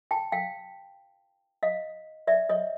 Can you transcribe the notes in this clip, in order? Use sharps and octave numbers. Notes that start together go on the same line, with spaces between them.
G5 A5
F5 G5
D#5 F5
D5 E5
C#5 D#5